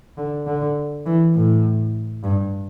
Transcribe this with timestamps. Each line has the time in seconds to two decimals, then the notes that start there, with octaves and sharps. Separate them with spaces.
0.17 D3
0.46 D3
1.06 E3
1.35 A2
2.24 G2